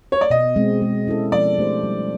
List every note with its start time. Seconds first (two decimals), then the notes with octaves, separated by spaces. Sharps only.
0.12 C#5
0.21 D5
0.30 B2 D#5
0.56 G#3 C4
0.82 G#3
1.07 C#4 E4 A4
1.32 F3 D5
1.58 A3 D4 G4 C5
1.83 G3